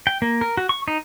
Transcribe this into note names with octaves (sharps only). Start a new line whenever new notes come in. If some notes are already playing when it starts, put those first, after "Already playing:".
G5
A#3
A#4
F#4
C#6
D#4